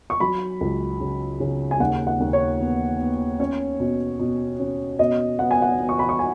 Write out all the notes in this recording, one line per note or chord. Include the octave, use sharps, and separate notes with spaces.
C#6
F#3 B5
C#2
C#3
C#3
G#5
D#2 F#5
F#5
D#2
C#5
B3
B3
C#4 C#5
B2
B2
C#4
B2 D#5
B3 F#5
G#5
F#5
B3
C#6
B5
C#6
G#5